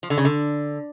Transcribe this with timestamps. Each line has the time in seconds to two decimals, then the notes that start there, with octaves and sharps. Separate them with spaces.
0.03 F3
0.10 D3
0.18 C#3
0.25 D3